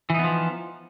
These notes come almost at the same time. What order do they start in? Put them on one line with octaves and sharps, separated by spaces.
E3 D#4 B3 F3